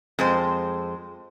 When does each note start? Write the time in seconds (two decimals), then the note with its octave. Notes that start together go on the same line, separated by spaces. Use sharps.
0.19 F2 G#3 C5